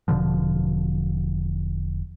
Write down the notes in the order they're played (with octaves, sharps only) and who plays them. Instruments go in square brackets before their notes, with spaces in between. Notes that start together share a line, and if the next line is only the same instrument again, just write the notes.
[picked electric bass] E1 B2 D3 F3